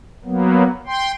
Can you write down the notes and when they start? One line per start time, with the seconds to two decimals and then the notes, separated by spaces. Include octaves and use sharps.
0.25 F#3 A#3 B3
0.86 G5 C6